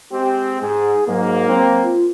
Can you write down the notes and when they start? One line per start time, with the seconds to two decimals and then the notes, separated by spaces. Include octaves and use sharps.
0.12 G#3 C4 G4
0.61 G#2 G#4
1.08 G#2 F#3 A#3
1.49 C4
1.83 F4